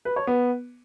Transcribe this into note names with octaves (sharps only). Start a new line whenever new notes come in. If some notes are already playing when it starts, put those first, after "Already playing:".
B4
C#5
B3